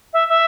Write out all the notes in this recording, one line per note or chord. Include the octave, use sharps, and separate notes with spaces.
E5
E5